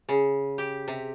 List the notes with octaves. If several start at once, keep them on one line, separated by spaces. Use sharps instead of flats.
C#3
G4
C3